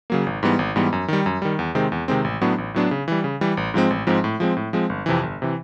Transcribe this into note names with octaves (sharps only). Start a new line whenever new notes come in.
C#3 F#3 A#3
G#1
G#2 E3 G3 B3
G#1
G#2 E3 G3 B3
F#2
D#3 G3
F#2
D#3 G3
E2
C3 D#3 G#3 C4
E2
C3 D#3 G#3 C4
A1
A2 F#3 B3 D4
A1
A2 F#3 B3 D4
C#3
E3 G3
C#3
E3 G3
A1
G#2 F3 G#3 C4
A1
G#2 F3 G#3 C4
A2
F3 G#3 C4
A2
F3 G#3 C4
G1
F2 C3 E3
G1
C3 E3